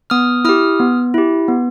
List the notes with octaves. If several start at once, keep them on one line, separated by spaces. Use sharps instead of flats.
B3 D#6 F6
E4 G4 D#6 F6
B3
E4 G4
B3